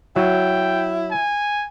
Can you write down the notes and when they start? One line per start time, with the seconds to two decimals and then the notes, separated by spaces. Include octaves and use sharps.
0.16 F#3 E4 G5
1.10 G#5